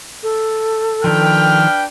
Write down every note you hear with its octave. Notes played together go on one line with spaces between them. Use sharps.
A4
D#3 F3 D4 B4 G5 F6